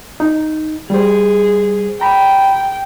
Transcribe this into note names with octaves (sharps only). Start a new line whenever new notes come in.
D#4
G3 G#4 C5
G5 A#5 B5